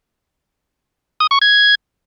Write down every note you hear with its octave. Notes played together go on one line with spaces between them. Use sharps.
D#6
C#6
G#6